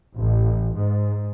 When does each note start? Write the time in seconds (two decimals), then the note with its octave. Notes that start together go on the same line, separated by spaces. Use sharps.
0.16 A1
0.74 G#2